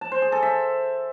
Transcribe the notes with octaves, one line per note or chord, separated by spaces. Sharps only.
A5
C5
G#4
A4
E5